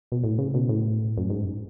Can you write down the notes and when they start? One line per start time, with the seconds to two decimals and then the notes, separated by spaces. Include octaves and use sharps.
0.12 B2
0.24 A2
0.38 C#3
0.54 B2
0.69 A2
1.18 F#2
1.30 G#2